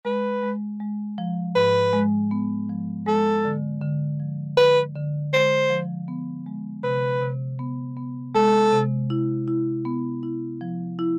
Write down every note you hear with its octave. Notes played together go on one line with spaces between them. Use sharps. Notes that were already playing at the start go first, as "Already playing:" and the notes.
G#3 B4
G#3
G#3
F3
G#2 B4
G#3
B3
F3
G#3 A4
D3
D3
F3
D3 B4
D3
G#3 C5
F3
B3
G#3
C3 B4
C3
B3
B3
G#3 A4
C3
E4
E4
B3
E4
F3
E4